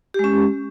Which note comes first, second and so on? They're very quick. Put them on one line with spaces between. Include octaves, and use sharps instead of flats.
G4 G#3 C#4